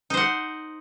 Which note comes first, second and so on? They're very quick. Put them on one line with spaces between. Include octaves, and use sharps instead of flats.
D#4 C5 F#5